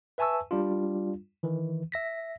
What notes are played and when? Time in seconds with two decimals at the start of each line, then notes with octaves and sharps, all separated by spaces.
0.18 B4 E5 G#5 A5 C#6 E6
0.51 G3 D4 F4
1.43 D#3 E3
1.92 E5 A#6 B6